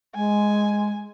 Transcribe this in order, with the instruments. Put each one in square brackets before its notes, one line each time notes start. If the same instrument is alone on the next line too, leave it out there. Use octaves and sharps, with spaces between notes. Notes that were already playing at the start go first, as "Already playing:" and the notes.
[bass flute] G#3 [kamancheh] G#5